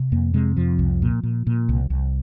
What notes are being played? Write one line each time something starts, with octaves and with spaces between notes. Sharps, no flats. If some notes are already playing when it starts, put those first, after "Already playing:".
Already playing: C3
F2 A#3
C3 G#3
F2 F3
C2
A#2
A#2
A#2
C2
C2